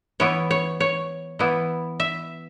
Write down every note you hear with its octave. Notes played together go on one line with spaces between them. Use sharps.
E3 B3 E4 C#5
C#5
C#5
E3 B3 E4
E5